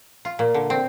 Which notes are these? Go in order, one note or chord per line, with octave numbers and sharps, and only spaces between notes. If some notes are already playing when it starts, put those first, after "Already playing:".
F4
A#2
D3
C4